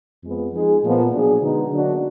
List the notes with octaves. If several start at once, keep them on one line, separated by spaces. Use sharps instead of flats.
F2 F3 G#3 B3
F3 G#3 D#4 G#4
A#2 F3 B3
B2 F#3 D4 G#4
D3 G#3 B3 D#4
D3 F#3 A#3 D4 F#4